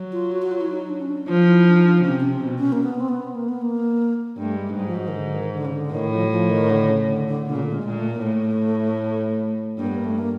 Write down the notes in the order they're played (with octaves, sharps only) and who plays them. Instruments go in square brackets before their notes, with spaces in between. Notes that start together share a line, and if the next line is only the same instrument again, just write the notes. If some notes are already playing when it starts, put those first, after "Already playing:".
Already playing: [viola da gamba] F#3
[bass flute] F4
F#4
F#4
F4
E4
D#4
D4
C#4
D4
[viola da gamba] F3 [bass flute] F4
[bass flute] E4
D4
D#4
D4
[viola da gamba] C3 [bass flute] C#4
[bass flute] C#4
C4
[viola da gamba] B2
[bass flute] C#4
A#3
B3
C4
B3
A#3
B3
A#3
[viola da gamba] G2 [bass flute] A3
[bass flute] G#3
[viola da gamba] G#2 [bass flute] G3
[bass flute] F3
F#3
D#3
D3
D#3
D3
C#3
D3
[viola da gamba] A2 [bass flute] D#3
[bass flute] F3
F#3
F3
D#3
D3
C#3
D3
D3
[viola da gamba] A#2 [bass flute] D3
[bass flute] C#3
D3
G#3
[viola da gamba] A#2
[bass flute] A3
A#3
[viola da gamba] A2 [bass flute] A3
[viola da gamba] G2 [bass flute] A#3
[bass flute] B3
A#3
A3
A#3